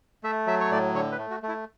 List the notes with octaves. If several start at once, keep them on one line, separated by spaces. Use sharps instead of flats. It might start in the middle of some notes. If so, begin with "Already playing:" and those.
A3 E5
F#3 E5
C#5
A2 D5
D3 C#5
B4
A3
F#4
A3
E4